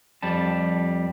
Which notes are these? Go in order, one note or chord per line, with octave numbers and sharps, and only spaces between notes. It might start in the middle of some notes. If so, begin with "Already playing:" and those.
F2 G3 A5